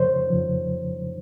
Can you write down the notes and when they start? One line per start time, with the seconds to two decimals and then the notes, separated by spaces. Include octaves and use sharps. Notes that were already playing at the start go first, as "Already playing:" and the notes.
Already playing: F2 C#3 F3 C5 C#5
0.30 F2 C#3 F3